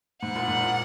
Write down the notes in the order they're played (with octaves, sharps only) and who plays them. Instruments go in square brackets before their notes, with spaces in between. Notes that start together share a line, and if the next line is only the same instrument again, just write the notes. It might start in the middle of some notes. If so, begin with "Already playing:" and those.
[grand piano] G#2 [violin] F#5
[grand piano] A#2
G#2
A#2